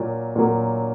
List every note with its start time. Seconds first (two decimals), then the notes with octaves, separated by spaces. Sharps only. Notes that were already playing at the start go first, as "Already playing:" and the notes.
Already playing: A#2 F#3 A#3
0.36 A#2 F#3 A#3